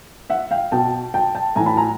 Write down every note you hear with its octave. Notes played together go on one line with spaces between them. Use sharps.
E5 F#5
F5 G5
B2 G5 A5
G5 A5
G5 A5
A2 E3 G#5 A#5
A5 B5
G#5 A#5